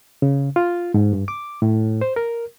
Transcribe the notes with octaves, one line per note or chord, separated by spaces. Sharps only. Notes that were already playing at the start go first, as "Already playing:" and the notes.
C#3
F4
G#2
G2
D6
A2
C5
A#4